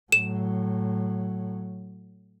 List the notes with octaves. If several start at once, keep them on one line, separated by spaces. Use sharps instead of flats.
A2 F#3 E7